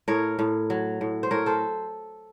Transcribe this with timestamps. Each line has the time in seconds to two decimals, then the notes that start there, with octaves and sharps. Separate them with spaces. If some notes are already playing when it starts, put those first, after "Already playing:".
0.08 A2 A#4 C#5
0.39 A2
0.70 F#3
1.01 A2
1.23 C5
1.31 A2 A#4 C#5
1.46 A4 C5